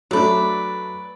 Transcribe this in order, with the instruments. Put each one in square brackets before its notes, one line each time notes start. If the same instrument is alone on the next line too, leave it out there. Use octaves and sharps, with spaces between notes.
[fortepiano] F#3 A3 D4 [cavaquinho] B4 D5